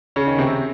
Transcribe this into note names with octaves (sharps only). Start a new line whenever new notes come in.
C#3 C#4
D#3
C3 C4